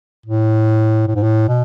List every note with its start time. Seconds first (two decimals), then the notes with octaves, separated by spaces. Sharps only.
0.26 A2
1.08 A2
1.15 G#2
1.23 A2
1.49 B2